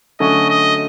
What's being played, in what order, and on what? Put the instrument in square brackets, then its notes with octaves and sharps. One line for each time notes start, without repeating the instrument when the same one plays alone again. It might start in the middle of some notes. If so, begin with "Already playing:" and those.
[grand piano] D3 F#3 A3 C#4 F#4 [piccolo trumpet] D#5
[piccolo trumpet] D#5